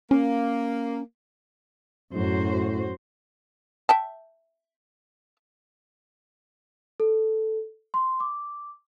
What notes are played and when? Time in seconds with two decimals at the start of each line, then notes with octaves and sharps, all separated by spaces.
0.11 A#3 C#4
2.15 F#2 A2 F#4 C5
3.89 E5 G5 A5
7.00 A4
7.94 C6
8.20 D6